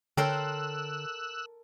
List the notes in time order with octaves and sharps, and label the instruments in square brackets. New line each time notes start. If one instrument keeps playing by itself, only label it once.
[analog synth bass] D3 [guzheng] A4 A#4 C6 [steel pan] C#5 G5 [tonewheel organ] E6 F#6